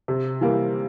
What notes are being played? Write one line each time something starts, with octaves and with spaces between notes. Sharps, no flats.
C3
E3 G3 A#3